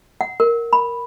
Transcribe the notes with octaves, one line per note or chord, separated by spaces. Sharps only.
F#5
A#4
B5